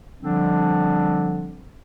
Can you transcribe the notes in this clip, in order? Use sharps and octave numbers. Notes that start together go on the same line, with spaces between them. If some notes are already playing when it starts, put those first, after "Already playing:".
D3 F3 G3 C4 D4